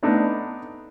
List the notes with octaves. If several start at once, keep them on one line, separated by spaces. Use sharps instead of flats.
A3 B3 D4 D#4